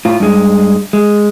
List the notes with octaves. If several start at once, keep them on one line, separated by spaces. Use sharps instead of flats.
A2 F4
G2 G#3
G#3